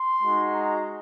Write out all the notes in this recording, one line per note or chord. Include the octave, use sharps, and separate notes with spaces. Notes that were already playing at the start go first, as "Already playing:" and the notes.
Already playing: C6
G#3 D#4 F#4
A#5